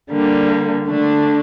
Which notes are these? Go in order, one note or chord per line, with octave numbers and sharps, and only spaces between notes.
D3 G3 A#3
D3 A3 D4